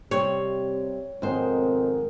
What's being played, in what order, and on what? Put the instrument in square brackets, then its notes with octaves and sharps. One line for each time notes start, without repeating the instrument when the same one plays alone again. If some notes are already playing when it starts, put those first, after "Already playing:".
[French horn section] C3 [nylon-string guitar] G3 C4 [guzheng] C#5
[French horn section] F2 B2 C4 [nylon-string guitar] G#2 C5 [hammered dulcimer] D#3